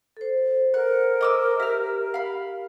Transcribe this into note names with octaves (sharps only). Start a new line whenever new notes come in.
A4 C5
A#4 F#5
D#5 D6 E6
G4 E5 F6
F5 B5